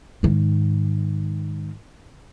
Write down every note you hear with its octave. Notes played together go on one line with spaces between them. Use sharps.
G#2 D#3